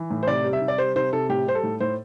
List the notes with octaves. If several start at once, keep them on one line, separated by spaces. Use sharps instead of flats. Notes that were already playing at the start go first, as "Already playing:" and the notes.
Already playing: E3
A2
C5
C3 D5
G3
E5
C3
D5
G3 C5
C3 C5
C3 A4
A2 G4
G3 C5
A4
A2
A2 C5